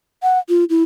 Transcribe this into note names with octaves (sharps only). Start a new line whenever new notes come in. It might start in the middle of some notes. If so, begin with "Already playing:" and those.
F#5
F4
E4